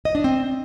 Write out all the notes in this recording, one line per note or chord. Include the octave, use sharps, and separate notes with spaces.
D#5
D4
C4